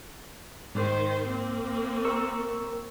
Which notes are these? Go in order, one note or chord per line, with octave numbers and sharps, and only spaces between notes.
G#2 D#3 C5
A#3 C4
A#4 C#6 E6